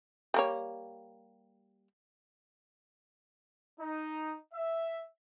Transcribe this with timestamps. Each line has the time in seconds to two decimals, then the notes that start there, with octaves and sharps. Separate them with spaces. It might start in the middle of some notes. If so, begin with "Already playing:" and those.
0.34 G3 A#3 C#5
3.80 D#4
4.53 E5